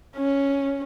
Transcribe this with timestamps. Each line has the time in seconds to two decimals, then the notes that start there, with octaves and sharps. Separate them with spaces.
0.16 C#4